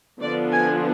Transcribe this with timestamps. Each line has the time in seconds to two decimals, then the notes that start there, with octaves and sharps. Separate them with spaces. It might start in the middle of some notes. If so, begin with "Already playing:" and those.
0.20 D3 F3 B3 D4 D5
0.52 G#5